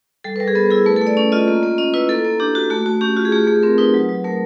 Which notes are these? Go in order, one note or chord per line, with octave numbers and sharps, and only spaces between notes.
G3 A4
B4
G3 A#4
G#4
B3 A4
E4 G#4
A3 B4
A4
A3
D5
C#4 D5
F4 D#5
A#3
A#3
C#4 D#5
E4 B4
A#3 A4
A#3
D4 G4
F#4
A3 F#4
A3 F#4
C#4 G4
F4 F#4
G#4
A3 G4
A3 G#4
C4 A#4
D#4 B4
F#3
F#3
A3 A#4